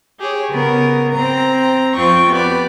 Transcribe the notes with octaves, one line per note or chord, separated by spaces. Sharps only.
G4 G#4 C#5
C#3 B3 A#4
C4 A#5
F2 C4 F4 G5 C#6
B3 G4 B4 D5